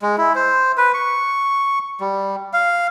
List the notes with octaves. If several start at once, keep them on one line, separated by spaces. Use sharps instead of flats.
G#3
E4
C5
B4
C#6
G3
F5